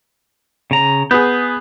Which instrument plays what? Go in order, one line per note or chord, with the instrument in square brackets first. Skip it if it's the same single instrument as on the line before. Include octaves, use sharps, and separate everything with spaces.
[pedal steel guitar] C#3 A#5
[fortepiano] B3 G#4 [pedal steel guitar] G6